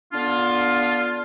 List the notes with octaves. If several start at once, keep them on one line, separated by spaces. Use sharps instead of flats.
D3 B3 D4 F4